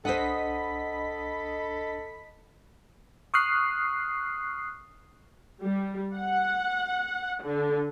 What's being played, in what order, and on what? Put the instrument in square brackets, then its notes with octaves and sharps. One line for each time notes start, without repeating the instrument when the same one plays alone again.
[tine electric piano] C2 D4 [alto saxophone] A4 [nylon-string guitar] C5 F#5 [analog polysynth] D#5 B5 B6
[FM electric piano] C#6 D#6 F6 F#6 C7
[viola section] G3
F#5
D3